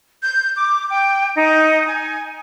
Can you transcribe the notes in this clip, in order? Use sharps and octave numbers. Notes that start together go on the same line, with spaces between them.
G6
D6
G5
D#4
G#5